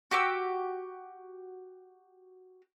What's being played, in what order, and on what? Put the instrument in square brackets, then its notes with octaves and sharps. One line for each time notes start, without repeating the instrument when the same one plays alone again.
[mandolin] F#4 G4 D6 E6